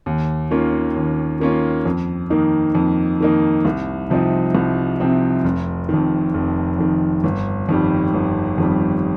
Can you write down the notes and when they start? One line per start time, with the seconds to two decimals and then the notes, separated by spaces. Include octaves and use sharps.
0.06 D#2
0.51 D#3 A#3 C#4 F4
0.96 D#2
1.40 D#3 A#3 C#4 F4
1.85 F2
2.30 D#3 A#3 D#4
2.75 F2
3.20 D#3 A#3 D#4
3.65 C2
4.10 C3 F3 C4 D#4
4.55 C2
5.00 C3 F3 C4 D#4
5.44 F1
5.89 F2 D#3
6.34 F1
6.79 F2 D#3
7.24 G1
7.69 F2 D#3 G3
8.14 G1
8.58 F2 D#3 G3